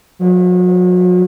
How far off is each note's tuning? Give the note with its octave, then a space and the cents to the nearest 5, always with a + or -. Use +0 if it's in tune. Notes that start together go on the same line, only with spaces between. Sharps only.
F#3 -40